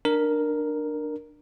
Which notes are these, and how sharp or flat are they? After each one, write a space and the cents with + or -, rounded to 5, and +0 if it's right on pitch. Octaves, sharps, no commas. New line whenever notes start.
D4 +20 A#4 +0